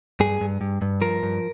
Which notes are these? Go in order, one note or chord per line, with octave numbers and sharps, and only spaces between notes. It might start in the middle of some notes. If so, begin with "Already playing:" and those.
G2 G#4
G2
G2
G2
F3 A#4
G2